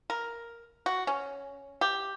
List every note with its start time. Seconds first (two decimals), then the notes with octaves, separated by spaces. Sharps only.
0.10 A#4
0.86 F#4
1.07 C#4
1.81 G4